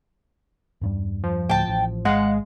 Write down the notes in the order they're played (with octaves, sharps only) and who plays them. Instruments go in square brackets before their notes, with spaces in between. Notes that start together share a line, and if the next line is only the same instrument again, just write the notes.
[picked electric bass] E2 G2 G3
[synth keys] F3
[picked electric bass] D2 A2 [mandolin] G5 A5
[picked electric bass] A1
[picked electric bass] G#1 [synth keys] G#3 F5 [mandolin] F#5